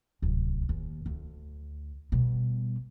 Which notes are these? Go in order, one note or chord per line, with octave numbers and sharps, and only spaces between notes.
D1 C2
D#2
D2
B2 G3